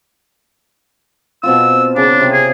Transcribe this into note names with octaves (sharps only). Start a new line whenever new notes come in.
B2 C4 F4 E6
C#3 D4
C3 G5
G#4